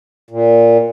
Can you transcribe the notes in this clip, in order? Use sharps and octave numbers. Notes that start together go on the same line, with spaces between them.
A#2